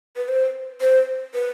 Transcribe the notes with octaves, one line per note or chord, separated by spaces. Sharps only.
B4
C5
C5
B4